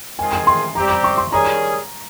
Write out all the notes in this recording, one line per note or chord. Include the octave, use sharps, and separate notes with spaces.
D#3 G#3 C4 F4 G#4 G#5
G#5
C6
G3 C4 G4 A#5
A#5
C#6
C6
D#3 G3 C#4 G#4 A#5